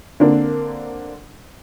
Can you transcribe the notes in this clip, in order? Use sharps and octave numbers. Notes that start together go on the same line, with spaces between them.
D3 A#3 C4 D4 A#4